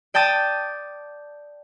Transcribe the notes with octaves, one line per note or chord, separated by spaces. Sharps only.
D5 G5 A5 D#6 A6